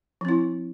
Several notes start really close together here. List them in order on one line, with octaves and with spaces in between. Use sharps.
F3 C4 E4